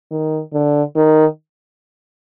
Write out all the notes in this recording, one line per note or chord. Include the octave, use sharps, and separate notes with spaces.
D#3
D3
D#3